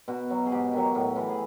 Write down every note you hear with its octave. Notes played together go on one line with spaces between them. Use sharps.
B2 F#4
F#3
G#4
G#2 G4
D#3 F#3
A2
E3
G#4